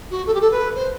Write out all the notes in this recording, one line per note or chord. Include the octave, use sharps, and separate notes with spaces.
F#4
A4
G4
A4
B4
C5